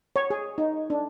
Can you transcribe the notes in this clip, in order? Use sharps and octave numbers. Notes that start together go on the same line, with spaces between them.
C#5
G#4
D#4
D4